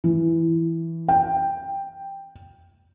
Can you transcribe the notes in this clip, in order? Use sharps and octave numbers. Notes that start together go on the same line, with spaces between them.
E3
G5